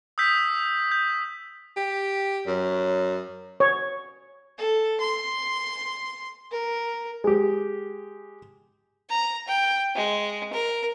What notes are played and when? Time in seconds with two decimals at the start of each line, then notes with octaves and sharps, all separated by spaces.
0.18 D#6 E6 G6 B6
0.92 G6
1.76 G4
2.47 F#2 C#5
3.60 C#5
4.58 A4
5.00 C6
6.52 A#4
7.24 G#3 G4
9.09 A#5
9.48 G5
9.95 G#3
10.53 A#4